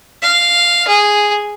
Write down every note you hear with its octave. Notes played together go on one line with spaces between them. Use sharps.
F5
G#4